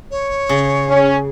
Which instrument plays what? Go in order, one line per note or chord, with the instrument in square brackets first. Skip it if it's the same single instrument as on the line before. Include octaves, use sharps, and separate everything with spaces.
[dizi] C#5
[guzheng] C#3
[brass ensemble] C#4